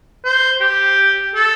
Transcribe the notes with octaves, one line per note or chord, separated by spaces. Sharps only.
C5
G4
A4